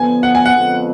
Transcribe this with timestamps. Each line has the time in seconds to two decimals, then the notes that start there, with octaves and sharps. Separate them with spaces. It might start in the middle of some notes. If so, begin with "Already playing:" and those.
Already playing: D3 F3 B3 G#5
0.23 F#5
0.35 G#5
0.46 F#5
0.54 F2 D3 G#3 B3 F4